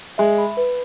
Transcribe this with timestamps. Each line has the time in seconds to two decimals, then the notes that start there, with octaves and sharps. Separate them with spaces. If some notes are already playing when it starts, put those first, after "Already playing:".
0.18 G#3 E5
0.38 B5
0.57 B4